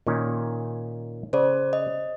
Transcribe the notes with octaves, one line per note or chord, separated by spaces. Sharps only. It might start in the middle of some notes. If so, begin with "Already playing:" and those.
A#2 D#3 C#4
C#3 C5 D5
D#5